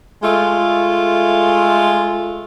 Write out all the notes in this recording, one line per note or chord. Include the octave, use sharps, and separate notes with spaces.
G#3 A3 F4